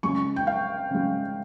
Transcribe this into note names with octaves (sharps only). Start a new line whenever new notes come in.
C#3 G#3 C#6
G5
F5
C#3 G#3